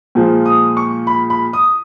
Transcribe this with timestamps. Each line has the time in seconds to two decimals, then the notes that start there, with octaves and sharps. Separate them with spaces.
0.15 A#2 F3 G#3
0.46 D#6
0.77 C#6
1.07 B5
1.30 B5
1.53 D#6